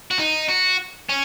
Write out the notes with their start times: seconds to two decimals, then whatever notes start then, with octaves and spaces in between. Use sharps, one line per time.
0.11 F#4
0.19 D#4
0.49 F#4
1.09 C#4